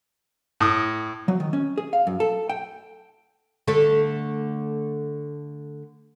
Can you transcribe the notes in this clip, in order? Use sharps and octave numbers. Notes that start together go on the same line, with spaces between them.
A2 D#6
F#3
D#3
C#4
G#4
F5
F#2
A4
G5
D3 A3 A4